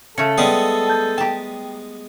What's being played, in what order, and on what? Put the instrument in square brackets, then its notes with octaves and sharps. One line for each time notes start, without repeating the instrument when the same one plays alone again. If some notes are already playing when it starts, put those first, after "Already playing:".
[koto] C#3 A3 [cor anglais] A4 [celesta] C#7
[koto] G3 [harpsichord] G#3 B3 G#4
[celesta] A5 G6 A6
[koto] G4 A5 [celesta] G5 A#5